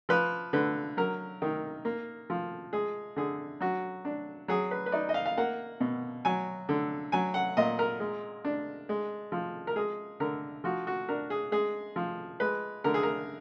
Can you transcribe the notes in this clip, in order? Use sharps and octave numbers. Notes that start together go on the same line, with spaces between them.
F3 B4
D3 B4
F#3 A#4
D#3
A#3
F3
G#3 G#4
D3 G#4
F#3 F#4
D4
F#3 G#4
B4
B4
D#4 D5
D#5
F5
F5
A#3 F#5
B2
F#3 G#5
D3
F#3 G#5
F#5
A#2 D#5
A#4
G#3
D4
G#3
F3
A#4
G#3 G#4
D3 A#4
F3 F#4
F#4
D4 A#4
G#4
G#3 G#4
F3
G#3 B4
D3 A#4
G#4
A#4